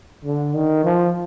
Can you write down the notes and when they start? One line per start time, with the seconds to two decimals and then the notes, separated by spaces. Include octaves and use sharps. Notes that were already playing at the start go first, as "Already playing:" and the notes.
0.25 D3
0.54 D#3
0.84 F3